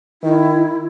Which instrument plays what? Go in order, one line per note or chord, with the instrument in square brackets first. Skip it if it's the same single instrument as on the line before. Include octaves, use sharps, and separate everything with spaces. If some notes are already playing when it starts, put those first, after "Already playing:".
[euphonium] D#3 [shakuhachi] E4